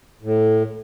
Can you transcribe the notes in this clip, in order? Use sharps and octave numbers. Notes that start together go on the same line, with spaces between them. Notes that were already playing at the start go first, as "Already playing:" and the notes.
A2